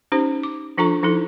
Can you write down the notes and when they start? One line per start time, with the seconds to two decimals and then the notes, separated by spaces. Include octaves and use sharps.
0.12 C#4 D#4 G4 C5
0.43 D6
0.78 F3 D4 F4 A4 A#5 C#6
1.03 F3 D#4 E4 A4